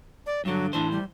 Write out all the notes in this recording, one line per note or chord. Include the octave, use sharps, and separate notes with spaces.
D5
G2 D3 F#3
A2 E3 D4 C5
G3